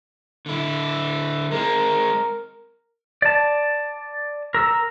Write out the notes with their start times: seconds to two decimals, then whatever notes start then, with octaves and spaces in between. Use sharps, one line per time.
0.46 D3 E4
1.51 G#3 C4 A#4
3.22 D5 A5
4.54 A#4 E6